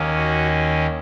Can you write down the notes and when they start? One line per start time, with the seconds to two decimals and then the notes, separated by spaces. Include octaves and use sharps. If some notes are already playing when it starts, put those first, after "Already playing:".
Already playing: D#2 D#3 A#3 C#4
0.16 F#4